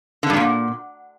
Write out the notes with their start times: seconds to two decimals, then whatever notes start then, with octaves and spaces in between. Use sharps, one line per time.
0.23 D3
0.30 G2
0.36 A#2